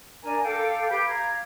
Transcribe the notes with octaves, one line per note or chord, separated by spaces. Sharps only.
D4 A#4 G#5 A#5
A4 F5 G5 D6
G4 B4 F5 G6
F5 A#5 G#6